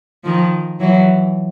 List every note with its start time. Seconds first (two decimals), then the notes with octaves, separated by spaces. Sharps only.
0.24 D#3 F3
0.80 E3 F#3